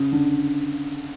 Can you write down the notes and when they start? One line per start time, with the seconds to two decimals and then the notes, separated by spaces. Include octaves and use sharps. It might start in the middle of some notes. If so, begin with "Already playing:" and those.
Already playing: C#3
0.12 D3